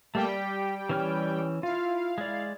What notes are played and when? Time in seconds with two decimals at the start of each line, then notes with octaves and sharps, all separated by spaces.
0.15 G3 A3 A#3 G5
0.29 G4
0.89 E3 C#4 F6
1.63 E4 F4 F5
2.18 G#3 D5